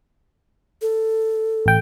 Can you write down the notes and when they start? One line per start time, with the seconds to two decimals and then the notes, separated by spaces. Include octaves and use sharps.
0.82 A4
1.66 A1 G5